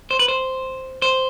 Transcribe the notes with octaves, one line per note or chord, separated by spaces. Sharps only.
C5
B4
C5
C5